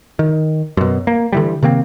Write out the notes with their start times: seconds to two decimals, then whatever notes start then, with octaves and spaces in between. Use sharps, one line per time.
0.19 D#3
0.77 F#2 B2
1.07 A#3
1.32 D3 E3 G3
1.63 C3 D#3 A#3 C4